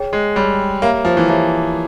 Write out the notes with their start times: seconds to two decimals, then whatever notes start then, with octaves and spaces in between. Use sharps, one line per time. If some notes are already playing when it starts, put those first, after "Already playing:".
Already playing: G#4 C#5 G5
0.13 G#3
0.35 G3 G#4 C#5 G5
0.82 A#3 G4 C#5 E5 A#5
1.05 F3
1.17 E3
1.28 F3 G4 C#5 E5 A#5